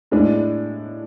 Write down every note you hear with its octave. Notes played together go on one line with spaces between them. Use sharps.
A2 G#3 D4